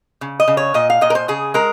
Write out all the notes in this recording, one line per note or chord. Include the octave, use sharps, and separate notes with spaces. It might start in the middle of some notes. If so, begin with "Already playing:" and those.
C#3
D#5
C#3
C#5
A#2 D#5
F5
A#2 D#5
A#4
C5
C#3 G#4
G#3 A#4